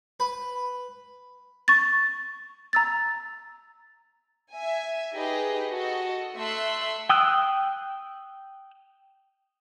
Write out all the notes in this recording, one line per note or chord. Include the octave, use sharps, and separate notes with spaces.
B4
C#6 A6
A#5 E6 A6
E5 G#5
D#4 G4 G#4 B4 D#5
F#4 A4 D#5
A3 E5 C6 E6 F#6
G5 D#6 E6 F#6